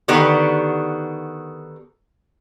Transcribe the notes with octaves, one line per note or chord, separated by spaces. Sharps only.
D3 D#3 B3 D4 F#4 G4